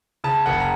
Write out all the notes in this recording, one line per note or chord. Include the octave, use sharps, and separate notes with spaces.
C#3 A5
F#1 F#5
A#5